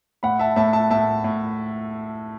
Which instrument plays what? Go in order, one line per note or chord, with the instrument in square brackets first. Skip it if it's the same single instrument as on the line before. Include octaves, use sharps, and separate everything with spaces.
[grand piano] A2 F#5 B5
E5 A5
A2 E5 A5
E5 A5
A2 E5 A5
A2